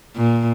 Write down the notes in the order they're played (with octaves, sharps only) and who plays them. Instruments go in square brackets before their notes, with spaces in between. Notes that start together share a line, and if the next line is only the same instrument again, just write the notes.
[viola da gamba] A#2